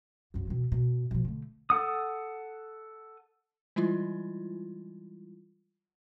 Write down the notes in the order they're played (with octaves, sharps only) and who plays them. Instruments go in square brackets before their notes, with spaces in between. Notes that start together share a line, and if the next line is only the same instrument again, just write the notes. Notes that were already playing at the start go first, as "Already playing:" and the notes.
[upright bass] C2 F#2
B2 E3
B2
B2 F3
D3 A3
[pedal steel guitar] A4 F#5 D#6
[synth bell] E3 G3 G#3 E4 F4